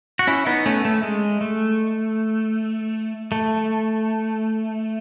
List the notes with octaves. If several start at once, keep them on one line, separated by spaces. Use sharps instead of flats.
F#4
C#4 E4
B3 D#4
A3 C#4
A3
G#3
A3
A3